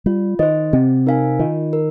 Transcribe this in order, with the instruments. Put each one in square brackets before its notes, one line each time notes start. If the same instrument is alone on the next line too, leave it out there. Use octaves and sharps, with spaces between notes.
[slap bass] G3 [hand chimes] F4
[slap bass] D#3 [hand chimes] C5 D#5
[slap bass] C3 [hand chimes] C4
[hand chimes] D#4 A#4 F5 G#5
[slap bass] D#3 [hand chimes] F4
[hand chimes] A#4